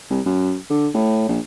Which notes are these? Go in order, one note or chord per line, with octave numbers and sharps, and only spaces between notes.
C2
F#2
D3
A2
A#1